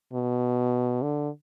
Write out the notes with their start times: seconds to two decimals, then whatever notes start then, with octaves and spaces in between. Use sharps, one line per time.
0.13 B2
1.02 D3